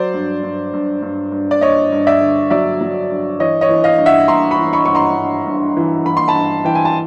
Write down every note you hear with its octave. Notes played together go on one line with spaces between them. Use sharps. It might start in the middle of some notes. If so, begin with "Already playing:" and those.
Already playing: F#3 C5 D5
G2
G2
G2
G2
G2
D5
G2 C#5 D#5
G2
D5 E5
D3
F#3 D5 E5
F#3
G2
E3 C#5 D#5
C#5 D#5
E3
D#5 F5
G2
E5 F#5
G2 A#5 C6
B5 C#6
E3
B5 C#6
G2 C#6
A#5 C6
G2
G2
E3
E3 B5
C6
A5 B5
G2
E3 G5
G#5
A5